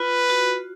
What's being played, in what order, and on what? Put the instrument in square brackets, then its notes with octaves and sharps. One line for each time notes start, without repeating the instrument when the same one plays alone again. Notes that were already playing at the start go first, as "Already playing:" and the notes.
Already playing: [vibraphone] F4 [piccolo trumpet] B4
[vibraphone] F#4